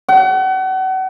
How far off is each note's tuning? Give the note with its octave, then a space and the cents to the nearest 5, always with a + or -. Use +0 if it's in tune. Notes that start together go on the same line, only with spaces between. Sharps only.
F#5 +35